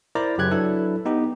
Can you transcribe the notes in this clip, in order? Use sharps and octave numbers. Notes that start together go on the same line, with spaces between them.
E4 A#4 C5 D5 A#5
F#2 C#3 G4 F#6 G#6
F#3 D4 E4 A4 B4
B3 D#4 G4